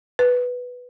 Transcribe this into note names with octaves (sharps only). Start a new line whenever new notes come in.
B4